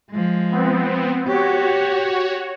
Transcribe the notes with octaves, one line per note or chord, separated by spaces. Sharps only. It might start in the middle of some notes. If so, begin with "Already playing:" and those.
F3 G#3
B3 C4
F#4 G4 C#5